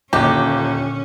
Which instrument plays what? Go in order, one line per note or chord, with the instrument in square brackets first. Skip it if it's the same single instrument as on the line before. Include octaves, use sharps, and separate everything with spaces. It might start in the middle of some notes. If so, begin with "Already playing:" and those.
[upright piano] D#1 [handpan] A#2 D3 A#3 [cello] C#4 [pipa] G4